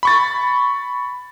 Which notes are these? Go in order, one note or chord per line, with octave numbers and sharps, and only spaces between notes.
B5 C#6 A6